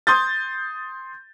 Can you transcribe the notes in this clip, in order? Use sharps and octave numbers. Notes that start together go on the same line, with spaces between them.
C6 D#6 G6 A6